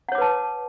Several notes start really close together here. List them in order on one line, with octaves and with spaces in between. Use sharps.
F#5 C#5 D6 B4 A5